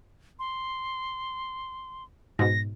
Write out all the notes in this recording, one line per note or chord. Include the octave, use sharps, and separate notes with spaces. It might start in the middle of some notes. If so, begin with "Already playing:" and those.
C6
G#2 B2 A#6